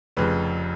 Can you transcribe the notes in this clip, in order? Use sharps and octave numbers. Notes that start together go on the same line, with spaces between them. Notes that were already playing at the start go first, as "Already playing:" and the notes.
F1 F2 C#3 B4